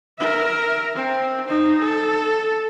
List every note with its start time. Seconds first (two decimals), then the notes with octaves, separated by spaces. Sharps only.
0.19 A#4 E5
0.95 C4
1.45 D#4 C5
1.78 A4